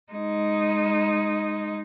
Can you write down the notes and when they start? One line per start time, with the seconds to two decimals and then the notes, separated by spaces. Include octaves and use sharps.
0.12 G#3 D#4